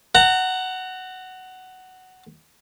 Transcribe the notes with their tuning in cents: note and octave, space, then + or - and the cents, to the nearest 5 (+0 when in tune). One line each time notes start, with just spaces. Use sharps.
F#5 +10 A#5 -30